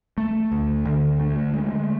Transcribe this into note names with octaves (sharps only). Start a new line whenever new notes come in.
A3
D2
D3
A3
G#3